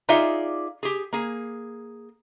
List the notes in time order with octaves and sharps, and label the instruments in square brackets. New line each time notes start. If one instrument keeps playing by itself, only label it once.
[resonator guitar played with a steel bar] D#4 F4 G#4 D5 E5 F5
G4 G#4
A#3 G#4